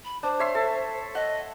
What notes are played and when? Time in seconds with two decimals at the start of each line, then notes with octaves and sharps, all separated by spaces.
0.04 B5
0.23 D4 C5
0.39 C#5 E5 C6
0.55 A4
1.15 D#5 F#5